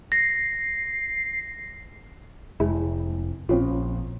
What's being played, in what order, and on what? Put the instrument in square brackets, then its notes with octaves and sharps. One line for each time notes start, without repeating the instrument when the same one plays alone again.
[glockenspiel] A#6 [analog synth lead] C7
[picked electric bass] F1 [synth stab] G#3 E4
[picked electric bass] A#1 [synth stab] C4 C#4 F4